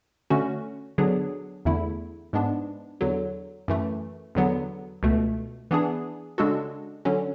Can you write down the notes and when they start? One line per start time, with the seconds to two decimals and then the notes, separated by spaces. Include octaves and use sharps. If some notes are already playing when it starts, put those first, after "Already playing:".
0.30 D3 A3 C#4 F#4
0.98 D3 F#3 B3 D4 G#4
1.65 E2 D3 A3 E4
2.33 G#2 G#3 B3 D4
3.01 E2 D3 F#3
3.68 F#2 E3 A3
4.35 E2 D3 F#3 B3
5.03 C#2 B2 A3
5.71 E3 B3 D4 G#4
6.38 C#3 G#3 D4 F#4 A4
7.05 D3 F#3 C#4